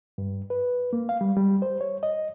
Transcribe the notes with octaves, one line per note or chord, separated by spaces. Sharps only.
G2
B4
A#3
F5
G3
G3
C5
C#5
D#5